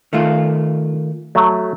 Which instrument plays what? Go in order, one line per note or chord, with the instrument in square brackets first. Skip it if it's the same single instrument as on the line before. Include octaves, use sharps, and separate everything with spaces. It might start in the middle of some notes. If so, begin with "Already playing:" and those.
[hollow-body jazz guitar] D#3 A3 F4 [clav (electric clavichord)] E5
[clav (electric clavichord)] F#3 A3